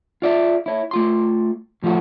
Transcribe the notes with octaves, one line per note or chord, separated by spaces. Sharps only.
F4 D5 E5
E4 C#5
A3 F4 C6
A2 F3 G3 A3 F#4